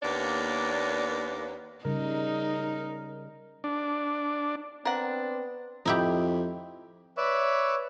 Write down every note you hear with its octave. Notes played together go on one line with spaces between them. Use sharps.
D#2 A#3 B3 D4 C#5 D5
C#3 G3 D#4 A#4
D4
B3 C4 D4 A#4 F#5
F2 D#4 E4 G4
B4 C#5 D5 E5